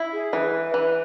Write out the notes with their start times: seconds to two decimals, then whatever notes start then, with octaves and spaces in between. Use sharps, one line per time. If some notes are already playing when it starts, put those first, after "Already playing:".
Already playing: E4
0.13 G#4
0.33 E3 B4
0.74 E3